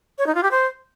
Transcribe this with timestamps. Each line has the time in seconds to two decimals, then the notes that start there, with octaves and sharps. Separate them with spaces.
0.18 C#5
0.27 D#4
0.35 F4
0.43 G4
0.51 C5